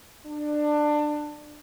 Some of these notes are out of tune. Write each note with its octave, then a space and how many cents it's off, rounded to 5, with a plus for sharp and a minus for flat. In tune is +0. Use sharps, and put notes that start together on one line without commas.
D4 +20